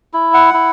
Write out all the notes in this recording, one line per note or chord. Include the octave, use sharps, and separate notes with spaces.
E4
F#5
E4